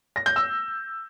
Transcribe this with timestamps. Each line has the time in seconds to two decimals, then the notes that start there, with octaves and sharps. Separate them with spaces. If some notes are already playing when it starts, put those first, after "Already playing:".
0.16 A#6
0.26 G6
0.36 E6